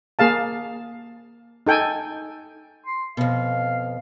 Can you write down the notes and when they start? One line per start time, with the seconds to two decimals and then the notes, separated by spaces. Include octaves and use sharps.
0.19 A#3 G#4 F5 A5
1.67 D#4 A4 G5 G#5
2.84 C6
3.17 F2 B2 F5